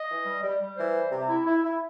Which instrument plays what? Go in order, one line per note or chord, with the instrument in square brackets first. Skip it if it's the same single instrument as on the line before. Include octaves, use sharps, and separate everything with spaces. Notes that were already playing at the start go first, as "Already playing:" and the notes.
Already playing: [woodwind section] D#5
E3
G3
G3
G3
E3 C5
G3
C3
E4
E4
E4